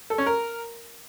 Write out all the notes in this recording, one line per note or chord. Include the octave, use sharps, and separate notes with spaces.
A4
C#4
A#4